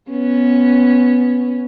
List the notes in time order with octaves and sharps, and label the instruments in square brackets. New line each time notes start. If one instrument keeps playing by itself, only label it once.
[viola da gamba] B3 C#4